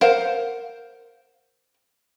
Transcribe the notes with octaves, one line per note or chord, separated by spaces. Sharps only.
A#4 C5 F5 F#5